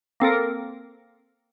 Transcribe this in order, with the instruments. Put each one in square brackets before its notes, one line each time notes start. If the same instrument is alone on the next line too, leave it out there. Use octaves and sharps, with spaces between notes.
[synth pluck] A#3 C4 A4 A#4